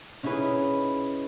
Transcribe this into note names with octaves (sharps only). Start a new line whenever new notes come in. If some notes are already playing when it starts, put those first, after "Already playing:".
C#4 D#4 E4 G#4 B4